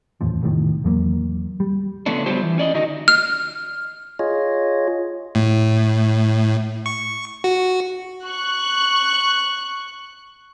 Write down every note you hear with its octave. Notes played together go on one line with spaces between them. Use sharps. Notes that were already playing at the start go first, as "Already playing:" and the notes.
D#1 A1 F2 F3
C2 F2 A2 D#3
E2 F#3 A#3
G3
C#3 F3 A3 B3 C#4 D4
F#3 G3 B3 F4 G4 C5
E3
C#4 D5 D#5
D3 D#4 F#4 D#5
F6
F4 G#4 C#5 D#5
A2
C#6
F#4
C#6 F#6